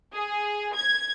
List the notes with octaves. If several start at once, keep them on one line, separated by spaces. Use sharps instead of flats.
G#4
G#6